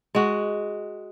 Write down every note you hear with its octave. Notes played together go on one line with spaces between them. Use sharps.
G#3 F#4